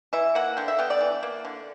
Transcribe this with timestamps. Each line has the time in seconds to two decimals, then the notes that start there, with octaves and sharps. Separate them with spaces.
0.13 E3 E5
0.35 A#3 F#5
0.57 D3 G5
0.68 E5
0.79 B3 G5
0.90 D5
1.01 E3
1.23 A#3
1.45 D3